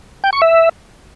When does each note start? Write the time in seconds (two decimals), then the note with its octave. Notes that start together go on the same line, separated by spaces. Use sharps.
0.24 G5
0.33 C#6
0.42 E5